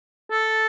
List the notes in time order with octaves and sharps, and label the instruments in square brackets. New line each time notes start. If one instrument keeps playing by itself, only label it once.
[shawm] A4